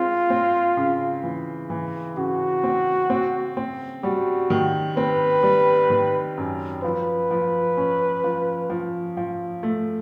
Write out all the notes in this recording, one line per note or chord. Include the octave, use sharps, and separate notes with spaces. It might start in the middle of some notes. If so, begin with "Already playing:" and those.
Already playing: G#3 C4 F4
C4
C#3
E3
E3
C#3 F#4
C4
C4
C4
G3 F#4
D#3
C4 B4
G3
D#3
F#2
F3 B4
F3
C#4
F3
F3
F3
A3